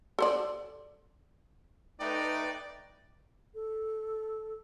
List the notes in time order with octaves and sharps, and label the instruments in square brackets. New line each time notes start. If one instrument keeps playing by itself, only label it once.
[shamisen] A4 C5 D5
[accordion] A3 B4 G5 [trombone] D#4 [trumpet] D5
[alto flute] A4